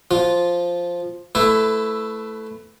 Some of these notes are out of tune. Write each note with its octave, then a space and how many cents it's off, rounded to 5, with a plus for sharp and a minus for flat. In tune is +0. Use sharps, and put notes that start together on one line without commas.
F3 +0 F4 +0
A3 +0 E4 +0 B4 +25